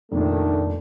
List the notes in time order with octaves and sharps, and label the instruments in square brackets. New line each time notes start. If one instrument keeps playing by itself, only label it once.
[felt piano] F1 A#2 [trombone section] D#3 A3 D4